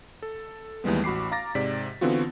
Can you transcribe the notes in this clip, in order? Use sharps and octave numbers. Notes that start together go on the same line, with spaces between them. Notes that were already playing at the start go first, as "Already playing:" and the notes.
A4
D#2 E3 G3 G#3 B3
A1 F#4 B5 D6 C7
F5 A#5 D6 A6 A#6
G#2 C3 D5 B6
D3 E3 B3 C4 F4 F#4